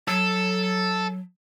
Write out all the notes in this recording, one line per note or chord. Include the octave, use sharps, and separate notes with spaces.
F#3 A4